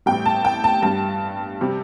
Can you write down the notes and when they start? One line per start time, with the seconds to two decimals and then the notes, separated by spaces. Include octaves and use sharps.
0.06 A1 A2 G3 G5
0.26 A5
0.45 G5
0.64 A5
0.82 G2 G3 A5
1.61 C3 G3